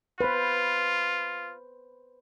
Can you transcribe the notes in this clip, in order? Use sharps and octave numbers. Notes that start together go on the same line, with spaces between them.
F4 B4 C5